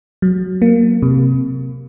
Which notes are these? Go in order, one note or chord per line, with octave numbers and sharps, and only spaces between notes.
F#3
A#3
C3